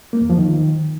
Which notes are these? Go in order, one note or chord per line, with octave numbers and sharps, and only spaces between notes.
A#3
E2
F3
D#3